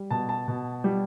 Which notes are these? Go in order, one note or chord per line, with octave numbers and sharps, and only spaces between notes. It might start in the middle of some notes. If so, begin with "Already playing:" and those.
Already playing: G3
B2 A5
A5
B2
G3